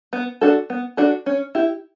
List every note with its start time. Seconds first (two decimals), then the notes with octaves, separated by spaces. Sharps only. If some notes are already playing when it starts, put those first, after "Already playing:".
0.13 B3
0.41 D4 F#4 A4
0.70 B3
0.97 D4 F#4 A4
1.26 C#4
1.55 E4 G4